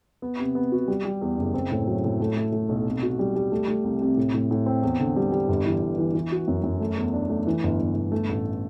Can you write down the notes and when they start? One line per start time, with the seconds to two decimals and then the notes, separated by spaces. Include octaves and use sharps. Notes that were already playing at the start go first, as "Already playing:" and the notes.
0.22 B3
0.39 C3
0.55 B3
0.72 F#4
0.88 G3
1.05 G3
1.21 E2
1.38 F#1
1.54 C4
1.71 A2
1.87 F#3
2.04 A2
2.21 A3
2.36 A3
2.52 A3
2.69 B1
2.86 C3
3.02 F#4
3.19 G3
3.36 G3
3.52 A3
3.68 A3
3.84 C2
4.01 C3
4.17 A2
4.33 A2
4.51 A2
4.66 C4
4.83 E2
4.99 D3
5.16 G3
5.32 G3
5.48 G1
5.66 E3
5.81 G2
5.98 E3
6.14 E3
6.32 F#4
6.48 F#2
6.64 F#2
6.80 A3
6.97 E2
7.13 D4
7.30 A3
7.47 E3
7.63 G1
7.80 G1
7.95 G1
8.12 A3
8.29 A1